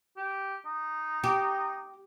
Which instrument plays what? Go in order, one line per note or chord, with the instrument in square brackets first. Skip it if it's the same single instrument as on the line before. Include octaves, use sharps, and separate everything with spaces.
[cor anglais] G4
D#4
[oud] G4